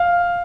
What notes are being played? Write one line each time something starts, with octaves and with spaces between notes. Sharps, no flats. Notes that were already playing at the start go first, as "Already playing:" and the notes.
Already playing: F5